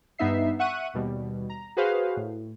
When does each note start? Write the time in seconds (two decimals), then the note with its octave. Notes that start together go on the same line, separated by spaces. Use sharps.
0.18 G2 B3 D#4 E5 C7
0.59 E5 F#5 C#6 F#6 D#7
0.94 D#2 B2 G3
1.50 A#5
1.77 F#4 G#4 B4 C5 F5
2.17 A2